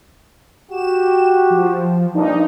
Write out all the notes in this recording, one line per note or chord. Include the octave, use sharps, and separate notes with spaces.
F#4 G4 E7
F3
G2 A#2 D4 D#4